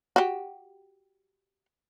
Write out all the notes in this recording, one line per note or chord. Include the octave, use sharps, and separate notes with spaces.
F#4 G4